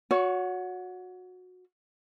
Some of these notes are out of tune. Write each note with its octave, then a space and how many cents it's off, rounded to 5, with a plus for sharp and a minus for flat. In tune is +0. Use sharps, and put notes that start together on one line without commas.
F#4 -20 C#5 +30